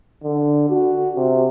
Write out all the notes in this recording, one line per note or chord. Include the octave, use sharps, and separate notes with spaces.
D3
F#4
C3